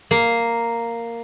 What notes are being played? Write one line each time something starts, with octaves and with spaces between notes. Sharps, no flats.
A#3